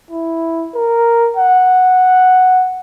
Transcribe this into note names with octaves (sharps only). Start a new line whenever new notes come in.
E4
A#4
F#5